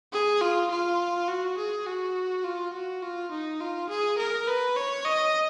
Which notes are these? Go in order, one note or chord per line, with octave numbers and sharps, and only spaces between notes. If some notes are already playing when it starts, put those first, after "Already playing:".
G#4
F4
F4
F#4
G#4
F#4
F4
F#4
F4
D#4
F4
G#4
A#4
B4
C#5
D#5